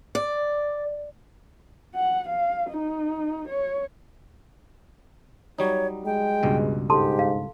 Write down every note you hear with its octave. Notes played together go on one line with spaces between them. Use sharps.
D5
F#5
F5
D#4
C#5
F#3 G3 D#4 C#5
G#3 G5
C#2 G2 B2
G#2 G4 A4 A5 C6
F5